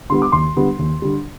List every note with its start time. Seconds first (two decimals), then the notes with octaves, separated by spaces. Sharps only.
0.10 D3 G3 B3 C6
0.22 D6
0.32 D#2 C6
0.56 D3 G3 B3
0.79 D#2
1.02 D3 G3